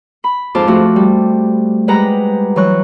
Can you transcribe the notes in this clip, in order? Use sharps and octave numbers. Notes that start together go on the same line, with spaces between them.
B5
F2 G#2 F4 A5 C6 D6
F3 A3 F#4
G3
G3 G#3 G4 B4 F#5 A#5
E3 F#3 C#6 F#6